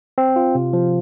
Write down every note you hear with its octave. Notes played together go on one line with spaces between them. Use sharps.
C4
F4
C3
F3